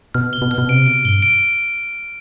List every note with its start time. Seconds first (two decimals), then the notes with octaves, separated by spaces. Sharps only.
0.14 B2 F6
0.33 G7
0.42 B2
0.51 F6
0.58 B2
0.69 C3 D7
0.86 B2 D7
1.05 G2 G7
1.22 D7